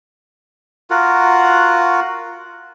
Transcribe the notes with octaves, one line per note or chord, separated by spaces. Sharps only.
F4 F#4 A#4 F#5